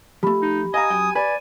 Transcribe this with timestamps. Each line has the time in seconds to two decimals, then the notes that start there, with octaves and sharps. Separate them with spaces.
0.23 F3 A3 G4 B5
0.42 D#4
0.74 D#5 F5 G#5 A#5 D#6
0.90 F#2 G5
1.15 B4 D5 G#5